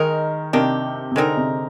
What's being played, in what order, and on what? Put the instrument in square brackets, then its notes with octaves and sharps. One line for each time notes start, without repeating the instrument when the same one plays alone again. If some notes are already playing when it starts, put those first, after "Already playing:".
Already playing: [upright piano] D#3 [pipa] G#3 D#4 A#4
[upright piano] C3 [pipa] D#3 A#3 D4 G4
[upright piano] C3
[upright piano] D3 [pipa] G#3 C4 D#4 A#4
[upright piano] C3